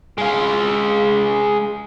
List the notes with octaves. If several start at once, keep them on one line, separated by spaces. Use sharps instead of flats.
G#3 F5